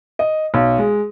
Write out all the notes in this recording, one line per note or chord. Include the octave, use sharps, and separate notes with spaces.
D#5
B1
G#3